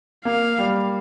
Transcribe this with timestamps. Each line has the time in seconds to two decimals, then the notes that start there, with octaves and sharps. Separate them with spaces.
0.25 A#3 F5
0.58 G3